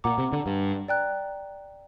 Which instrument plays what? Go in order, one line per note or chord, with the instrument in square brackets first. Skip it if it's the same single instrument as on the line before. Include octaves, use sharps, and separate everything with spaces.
[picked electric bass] A#2 [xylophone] F#5 A#5 D6
[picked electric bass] C3
D3
G2
[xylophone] D5 G5 A#5 F#6